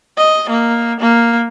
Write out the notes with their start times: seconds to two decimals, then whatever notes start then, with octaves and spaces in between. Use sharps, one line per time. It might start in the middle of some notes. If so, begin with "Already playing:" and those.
0.17 D#5
0.50 A#3
1.00 A#3